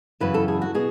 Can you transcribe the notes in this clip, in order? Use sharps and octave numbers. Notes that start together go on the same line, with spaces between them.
F#2 C#3 E3 B4
A4
G#4
F#4
B2 G#4